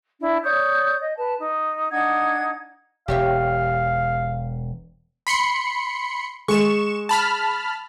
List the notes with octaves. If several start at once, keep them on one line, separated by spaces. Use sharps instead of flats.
D4 E4
C#5 D5 D#6 G6
D#5
B4 A5
D#4
D4 D#4 F#5 G#6
E1 G4 C#5 E5 F5
B5 C6 C#7
G#3 C#6 E7
A5 B5 F6